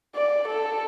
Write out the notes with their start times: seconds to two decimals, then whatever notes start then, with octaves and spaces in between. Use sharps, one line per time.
0.15 D5
0.48 A4